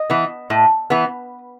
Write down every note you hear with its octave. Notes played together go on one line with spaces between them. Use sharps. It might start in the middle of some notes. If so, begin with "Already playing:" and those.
Already playing: D#5
E3 B3
A2
E3 B3